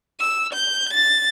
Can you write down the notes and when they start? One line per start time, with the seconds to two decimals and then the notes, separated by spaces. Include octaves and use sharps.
0.20 E6
0.53 G6
0.93 A6